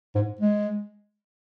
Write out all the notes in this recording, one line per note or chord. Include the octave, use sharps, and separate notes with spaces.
G#2
G#3